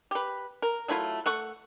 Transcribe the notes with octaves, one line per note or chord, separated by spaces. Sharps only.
G4 B4
A#4
F#3 A3 E4 F4
A3 F#5 C#6